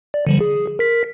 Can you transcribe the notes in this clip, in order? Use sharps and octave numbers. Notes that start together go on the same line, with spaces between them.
D5
D3 F3 G3
G#4
A#4 B6